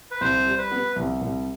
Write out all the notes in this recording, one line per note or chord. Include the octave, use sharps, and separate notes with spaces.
B4
C2 C5
G3
B4
B3
C2
C2